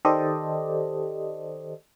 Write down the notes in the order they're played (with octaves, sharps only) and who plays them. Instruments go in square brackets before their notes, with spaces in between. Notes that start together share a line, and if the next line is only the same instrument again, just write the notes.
[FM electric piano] D#3 G4 A4 C5 D5 D#5